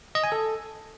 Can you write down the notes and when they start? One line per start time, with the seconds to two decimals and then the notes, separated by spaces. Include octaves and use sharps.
0.15 D#5
0.24 G#5
0.32 A4